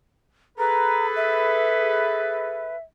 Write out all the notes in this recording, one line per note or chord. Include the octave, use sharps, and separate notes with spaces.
G#4 A4 B4 A#5
E5